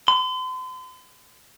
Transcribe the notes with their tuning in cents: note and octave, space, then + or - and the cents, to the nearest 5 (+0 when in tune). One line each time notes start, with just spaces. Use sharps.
C6 -45